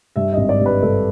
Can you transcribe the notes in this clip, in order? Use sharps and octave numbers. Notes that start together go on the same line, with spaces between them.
G2 E5
G#1 D#5
D5
G2
B4
G2 A4